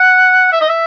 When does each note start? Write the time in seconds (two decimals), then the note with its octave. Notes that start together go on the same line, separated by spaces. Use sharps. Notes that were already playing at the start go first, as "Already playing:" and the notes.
Already playing: F#5
0.52 E5
0.61 D#5
0.69 E5